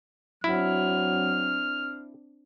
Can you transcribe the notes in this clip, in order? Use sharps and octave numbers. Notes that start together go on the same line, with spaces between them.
F#3 C4 D4 E4 F6